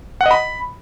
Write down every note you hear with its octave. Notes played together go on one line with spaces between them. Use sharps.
F#5
D#5
B5